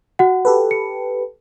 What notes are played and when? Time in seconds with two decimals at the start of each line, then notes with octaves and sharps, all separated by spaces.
0.19 F#4 F#5
0.45 G4 A4 B4
0.71 C#7